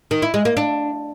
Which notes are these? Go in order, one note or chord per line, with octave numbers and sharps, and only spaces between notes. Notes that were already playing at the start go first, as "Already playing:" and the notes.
D#3
E4
G#3
A#3
D4